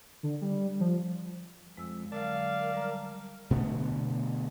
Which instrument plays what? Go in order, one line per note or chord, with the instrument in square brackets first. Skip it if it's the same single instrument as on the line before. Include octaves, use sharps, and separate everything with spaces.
[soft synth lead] D3
G3
F3
[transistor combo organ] F2 [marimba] G#3 E6
[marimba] D3 F#3 [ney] A#4 [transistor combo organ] D5 A5 [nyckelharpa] F5
[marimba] G3 A#5
[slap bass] B2 D3 A3 B3